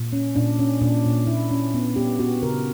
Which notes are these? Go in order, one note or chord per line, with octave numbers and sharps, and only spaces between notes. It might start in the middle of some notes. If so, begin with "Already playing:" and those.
Already playing: A#2
C#4
A#2 D4
C#4
A#2 D4
A#2
A#2 E4
C#4
B3
B3 G4
B3 F#4
C#3 A#4